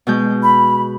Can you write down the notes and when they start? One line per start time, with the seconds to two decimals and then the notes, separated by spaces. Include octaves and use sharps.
0.07 B2 G#3 G6
0.43 B5